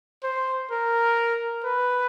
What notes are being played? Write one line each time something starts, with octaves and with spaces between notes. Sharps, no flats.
C5
A#4
B4